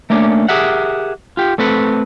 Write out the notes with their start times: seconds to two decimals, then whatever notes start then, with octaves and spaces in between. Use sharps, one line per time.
0.10 A3 A#3 C#4 D4
0.49 G4 G#4 A#4 E5 F#5
1.37 F4 G4
1.58 A3 C4 A4 B4